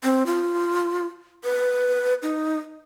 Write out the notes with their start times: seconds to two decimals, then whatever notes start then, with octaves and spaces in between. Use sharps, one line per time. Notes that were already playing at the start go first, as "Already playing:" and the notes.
0.04 C4
0.26 F4
1.44 B4
2.23 D#4